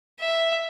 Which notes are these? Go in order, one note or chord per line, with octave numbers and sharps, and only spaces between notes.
E5